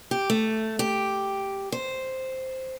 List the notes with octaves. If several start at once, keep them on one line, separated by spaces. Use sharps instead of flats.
G4
A3
G4
C5